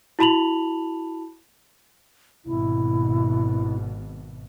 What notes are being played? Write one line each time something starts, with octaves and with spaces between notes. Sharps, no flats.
E4 F#4 A5 B5 F7 F#7
G#1 B2 E4